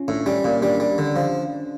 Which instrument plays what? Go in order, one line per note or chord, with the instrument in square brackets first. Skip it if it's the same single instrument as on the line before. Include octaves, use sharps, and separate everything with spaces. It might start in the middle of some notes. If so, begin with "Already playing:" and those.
Already playing: [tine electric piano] C#4 F4
[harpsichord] A2 [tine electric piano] D4
[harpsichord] G3 [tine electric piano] C#4
[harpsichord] A#2
[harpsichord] G3 [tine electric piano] D4
[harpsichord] G3
D3
F3